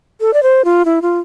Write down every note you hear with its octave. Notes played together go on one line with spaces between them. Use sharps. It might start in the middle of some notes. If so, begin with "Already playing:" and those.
A4
D5
C5
F4
E4
F4